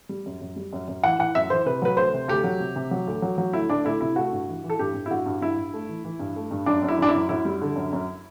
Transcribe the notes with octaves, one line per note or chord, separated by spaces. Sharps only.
G3
F#2
F#2
G3
F#2
F#2
E3 F#5
E3 F#5
F#2 E5
E3 C5
C3 B4
F#3 B4
D2 C5
C3
D2 G4
F#3
C3
C3
F#3
D2
F#3
F#3
D2 E4
D2 D4
D2 E4
C3 E4
A3 F#4
G2
E3
E3
A4
G2 G4
G2
E4
G2 F#4
G2
G2 E4
G2
A3
E3
E3
G2
A3
G2
F#2 D4
F#2
E4
F#2 D4
E4
F#2
F#2 E4
G3
D3
F#2
F#2